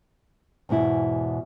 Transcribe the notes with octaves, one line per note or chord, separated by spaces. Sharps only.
E2 G#2 B2 E4